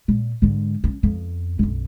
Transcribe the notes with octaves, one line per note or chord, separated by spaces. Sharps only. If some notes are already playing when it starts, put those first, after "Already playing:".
A#2
G#2 D3
C4 C#4
F2 B3
B1 F#2